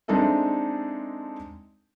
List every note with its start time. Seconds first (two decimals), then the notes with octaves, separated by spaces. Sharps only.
0.08 G#3 C4 D4 D#4 A4 E5